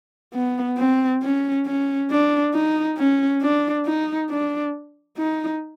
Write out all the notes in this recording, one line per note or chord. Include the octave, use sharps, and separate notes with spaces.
B3
C4
C#4
C#4
D4
D#4
C#4
D4
D#4
D4
D#4